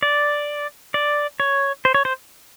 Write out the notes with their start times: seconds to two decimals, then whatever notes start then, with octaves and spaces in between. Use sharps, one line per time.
0.03 D5
0.94 D5
1.40 C#5
1.85 C5
1.94 C#5
2.05 C5